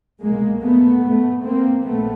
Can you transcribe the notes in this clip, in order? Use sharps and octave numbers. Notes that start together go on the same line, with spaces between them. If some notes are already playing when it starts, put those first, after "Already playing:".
C2 B2 G#3 A#3
A3 B3
A3 B3
A#3 C4
A#1 A3 B3